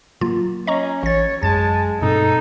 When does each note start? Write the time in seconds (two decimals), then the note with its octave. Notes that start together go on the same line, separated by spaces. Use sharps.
0.21 F#3 A#3 F4
0.67 C#4 D#5 A#5 C#6
1.03 A1 C#5 A6
1.43 F#2 G#3 A5 G#6
2.02 G2 B2 C4 D#4 A4